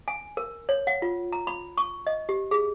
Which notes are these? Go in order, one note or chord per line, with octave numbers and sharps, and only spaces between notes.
G#5
A#4
C#5
F#5
F4
A#5
B5
C#6
D#5
G4
G#4